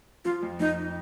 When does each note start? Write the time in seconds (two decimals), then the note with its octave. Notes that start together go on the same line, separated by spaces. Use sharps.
0.25 F3 F4
0.43 F2
0.60 F2 D#4